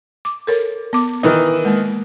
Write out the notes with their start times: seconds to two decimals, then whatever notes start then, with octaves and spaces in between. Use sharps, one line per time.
0.25 D6
0.47 A4 A#4 C#5
0.93 B3 D6
1.23 D#3 E3 D#4
1.65 G#3 A#3